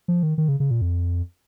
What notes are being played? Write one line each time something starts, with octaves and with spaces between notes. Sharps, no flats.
F3
D#3
D#3
C#3
C#3
A#2
F2